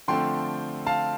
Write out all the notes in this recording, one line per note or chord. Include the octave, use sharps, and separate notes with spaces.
D3 F3 A3 C4 G5 C6
F5 A5